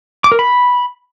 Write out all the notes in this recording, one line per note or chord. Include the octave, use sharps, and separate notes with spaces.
D6
A#4
B5